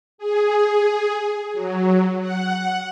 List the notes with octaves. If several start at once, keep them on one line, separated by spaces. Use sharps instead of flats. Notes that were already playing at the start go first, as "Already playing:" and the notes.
G#4
F#3
F#5